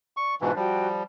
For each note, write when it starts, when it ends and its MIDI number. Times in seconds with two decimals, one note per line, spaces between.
0.17 0.37 74
0.17 0.35 85
0.41 0.52 44
0.41 0.52 47
0.41 0.52 52
0.41 0.55 62
0.41 0.55 65
0.41 0.55 71
0.56 1.03 53
0.56 1.03 55
0.56 0.86 66
0.56 0.86 79